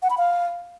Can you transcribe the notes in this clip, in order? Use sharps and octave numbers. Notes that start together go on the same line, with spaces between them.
F#5
B5
F5